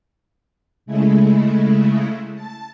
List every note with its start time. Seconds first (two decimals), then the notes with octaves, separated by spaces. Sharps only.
0.86 C#3 G#3 A3 E4
2.35 A5